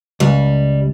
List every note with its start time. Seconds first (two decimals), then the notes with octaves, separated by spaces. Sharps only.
0.20 C#2 G3